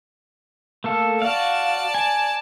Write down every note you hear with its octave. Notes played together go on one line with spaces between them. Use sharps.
A3 A#3 A4
F#4 D5 F5 A5
G#5